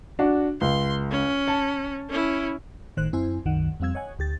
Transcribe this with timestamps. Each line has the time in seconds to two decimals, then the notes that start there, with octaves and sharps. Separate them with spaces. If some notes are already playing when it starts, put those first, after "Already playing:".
0.19 D4 F#4
0.61 C#2 C6
1.11 C#4
1.48 A5
2.09 C#4 E4
2.97 G1 A2 D#3 C5 F#6
3.13 F#2 C4 E4 C5 G#5
3.45 C2 F#2 D#3 F#5
3.80 F2 G3 C4 F5 E6 G#6
3.95 C#5 D#5 F#5 G#5
4.19 D2 G4 A6